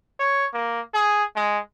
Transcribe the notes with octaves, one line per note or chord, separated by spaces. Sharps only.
C#5
A#3
G#4
G#3